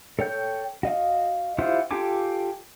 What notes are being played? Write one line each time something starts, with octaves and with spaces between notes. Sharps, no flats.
A4 C#5 G5 G6
F#4 D#5 F5
E4 F4 G4 C5 F#5
F4 G4 A4 G#5 D6